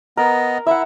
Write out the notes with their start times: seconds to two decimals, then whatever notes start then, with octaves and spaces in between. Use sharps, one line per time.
0.17 B3 A#4 D#5
0.67 E4 E5 F#5